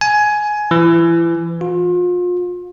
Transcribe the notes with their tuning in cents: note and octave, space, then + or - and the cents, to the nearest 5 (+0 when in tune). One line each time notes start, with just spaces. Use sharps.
G#5 +15
E3 +30
F4 +35